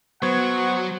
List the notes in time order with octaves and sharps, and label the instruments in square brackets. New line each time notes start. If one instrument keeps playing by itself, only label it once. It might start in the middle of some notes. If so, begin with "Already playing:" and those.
[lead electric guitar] F#3 [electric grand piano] B3 C5 G#6 [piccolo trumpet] F#5 [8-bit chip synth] C#6